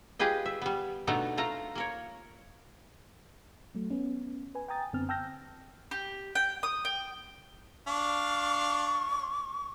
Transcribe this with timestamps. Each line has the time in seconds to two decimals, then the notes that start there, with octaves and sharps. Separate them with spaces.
0.19 F4 G4 G#4 B4 D#5
0.46 E5
0.62 G3 B3
1.07 B2 A3 B3 D4 D#4 A#5
1.37 A3 F4 A#5
1.75 A#3 A#4 C#5
3.75 F#3 A3
3.90 B3 C#4
4.55 B4 G#5
4.68 G5 G#5 A#5 D#6 A6
4.93 F#2 D3 B3 C4 F6
5.09 G5 A5 E6 F6 G6 A#6
5.91 G4
6.35 G5
6.63 D#6
6.85 G5
7.87 D4 F5 C#6